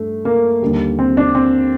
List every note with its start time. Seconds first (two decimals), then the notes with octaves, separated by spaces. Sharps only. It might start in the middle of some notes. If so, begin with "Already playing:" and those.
Already playing: G2 A3
0.25 A#3
0.62 D#2 D3 G3
0.99 C4
1.17 D4
1.35 C4